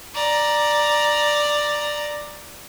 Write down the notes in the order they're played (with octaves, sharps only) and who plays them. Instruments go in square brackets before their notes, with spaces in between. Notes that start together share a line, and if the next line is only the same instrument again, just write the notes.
[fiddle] D5 A#5